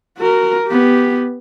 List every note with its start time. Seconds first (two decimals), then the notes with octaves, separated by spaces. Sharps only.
0.18 F#4 A#4
0.67 B3 G4